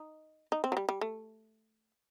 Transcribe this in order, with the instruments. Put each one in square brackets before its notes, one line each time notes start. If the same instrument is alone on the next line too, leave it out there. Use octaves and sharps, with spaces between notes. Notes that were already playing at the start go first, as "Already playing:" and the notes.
Already playing: [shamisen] D#4
D#4
C4
F#3
G3
G3
A3